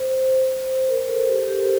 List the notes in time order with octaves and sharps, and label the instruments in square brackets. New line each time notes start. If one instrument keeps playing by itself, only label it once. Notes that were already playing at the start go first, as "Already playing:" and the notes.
Already playing: [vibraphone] C5
C5
A#4
A4
G4
A4
G4